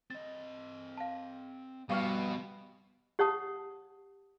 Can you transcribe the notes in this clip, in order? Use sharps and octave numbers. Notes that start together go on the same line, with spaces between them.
C4 D#5 A6
F5 A5
G2 B2 F3 G4 F5 C#6 F6
G4 C#5 F#5 A5 D#6